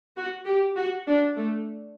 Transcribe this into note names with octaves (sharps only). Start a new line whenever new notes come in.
F#4
G4
F#4
D4
A3